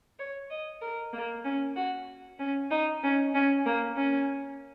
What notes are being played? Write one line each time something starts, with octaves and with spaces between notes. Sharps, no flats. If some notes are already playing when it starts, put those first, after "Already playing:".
C#5
D#5
A#4
A#3
C#4
F#4
C#4
D#4
C#4
C#4
A#3
C#4